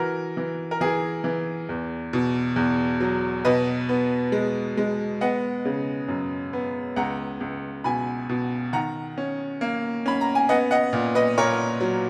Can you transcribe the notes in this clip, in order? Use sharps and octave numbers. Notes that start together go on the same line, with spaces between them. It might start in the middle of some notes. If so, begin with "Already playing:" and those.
Already playing: E3 F#4 A#4
E3
A#4
E3 G#4
E3
E2
B2
E2
F#3
B2 B4 D#5
B3
G#3
G#3
B3 D#5 F#5
C#3
F#2
B3
C#2 F#5 A#5
C#2
B2 G#5 B5
B2
D#3 F#5 A#5
C#4
A#3
C#4 B5
A#5
G#5
B3 D#5 F#5
D#5 F#5
A#2
B4 D#5
A#2 A#4 C#5
F#3